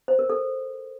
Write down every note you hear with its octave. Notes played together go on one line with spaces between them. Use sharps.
C5
A#4
A4